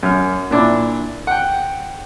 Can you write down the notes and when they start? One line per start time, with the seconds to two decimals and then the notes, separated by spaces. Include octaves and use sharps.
0.03 F#2 F6
0.51 A#2 D4 E4
1.27 F#5 G5